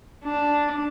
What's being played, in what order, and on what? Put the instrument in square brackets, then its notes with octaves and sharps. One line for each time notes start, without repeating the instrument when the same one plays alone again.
[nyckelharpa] D4